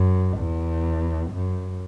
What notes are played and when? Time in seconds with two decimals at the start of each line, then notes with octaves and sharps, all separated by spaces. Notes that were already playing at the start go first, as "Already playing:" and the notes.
Already playing: F#2
0.37 E2
1.31 F#2